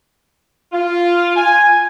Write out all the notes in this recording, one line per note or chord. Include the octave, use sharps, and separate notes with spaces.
F4
G#5